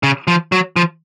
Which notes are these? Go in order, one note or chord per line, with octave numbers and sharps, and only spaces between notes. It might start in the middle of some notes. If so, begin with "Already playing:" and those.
C#3
F3
F#3
F3